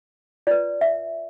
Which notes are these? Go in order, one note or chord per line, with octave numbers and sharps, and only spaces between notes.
F4 B4 D5
E5